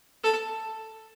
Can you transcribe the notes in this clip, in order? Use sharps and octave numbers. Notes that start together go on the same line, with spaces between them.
A4